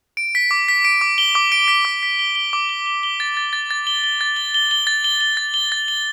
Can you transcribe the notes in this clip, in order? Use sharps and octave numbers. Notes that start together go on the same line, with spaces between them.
D7
B6
D6
B6
D7
D6
G7
D6
D7
B6
D6
B6
G7
G7
D6
G7
G7
G7
A6
A6
A6
A6
G7
G7
A6
G7
G7
G7
A6
G7
G7
A6
G7
A6
G7